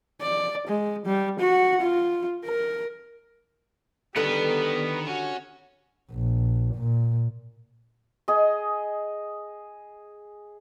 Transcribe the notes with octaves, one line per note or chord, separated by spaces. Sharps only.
D5
G#3
G3
F#4 F#5
F4
A#4
D3 D#3 G3 B3 A4 B4 D#5 F#5
C#4 F#4
A#1
A#2
G#4 D#5